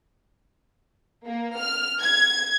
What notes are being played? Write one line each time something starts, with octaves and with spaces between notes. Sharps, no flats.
A#3
F6
G#6